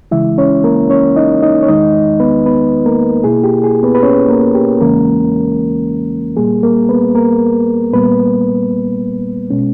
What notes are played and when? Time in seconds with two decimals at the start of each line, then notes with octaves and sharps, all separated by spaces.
0.11 C#3 E3 G#3 E4 E5
0.38 C#4 C#5
0.64 A#3 A#4
0.90 C#4 C#5
1.16 D#4 D#5
1.43 D#4 D#5
1.63 C#5
1.68 E2 D#3 G#3 D#4 D#5
2.20 B3 B4
2.46 B3 B4
2.85 A#3 A#4
3.24 B2 A#3 E4 G#4
3.44 G4
3.64 G#4
3.83 B3 B4
3.95 B4
4.03 C#4 C#5
4.29 A#3 A#4
4.55 G4
4.80 E2 C#3 E3 G#3 A#3 C#4 A#4
6.37 A#2 G3 A#3 G#4
6.63 A#3 A#4
6.89 B3 B4
7.15 A#3 A#4
7.93 A#2 G3 A#3 B3 B4
9.50 B2 G#3 C#4